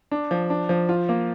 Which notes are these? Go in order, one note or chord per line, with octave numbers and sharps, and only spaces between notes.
D4
F3
D4
F3
F4
A#3